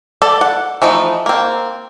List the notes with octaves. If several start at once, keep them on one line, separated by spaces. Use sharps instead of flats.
A4 D5
F#5
E3 F3 A3 D#4
A#3 C4